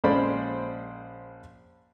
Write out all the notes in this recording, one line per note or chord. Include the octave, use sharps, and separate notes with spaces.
A#1 G#3 C#4 C5 D5 B5